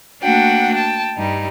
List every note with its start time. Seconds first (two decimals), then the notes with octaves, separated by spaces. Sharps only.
0.22 A3 A#3 D4 F#4 F#5 G5
0.74 G5 A5
1.17 G2 G3 D#4